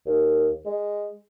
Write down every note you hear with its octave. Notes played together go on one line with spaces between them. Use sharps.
D#2
G#3